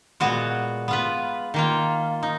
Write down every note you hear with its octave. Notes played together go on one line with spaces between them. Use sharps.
A#2 G#3 B3 F#4
B3 F4 B4
D#3 A#3 F4
D#4